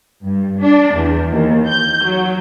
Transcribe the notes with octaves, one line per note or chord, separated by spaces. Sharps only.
G2
D4
E2
D#2
G6
F#3